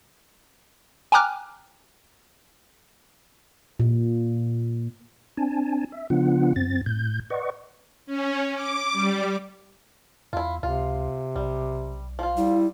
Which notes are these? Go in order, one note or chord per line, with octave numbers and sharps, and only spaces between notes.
G5 G#5 A#5 D6 F6 F#6
A#2
C4 D4 G#5 A5
E5
C#3 F3 B3 D4 F4 F#5
F#2 C4 A6
A2 G6
B4 D5 D#5 F#5 C#6
C#4
D6
G3
E2 E4 F4
C#2 C3 F4
B1 G3
F3 F4
G3 E4